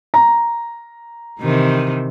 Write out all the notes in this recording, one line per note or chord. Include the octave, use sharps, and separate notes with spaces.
A#5
C3 D#3 E3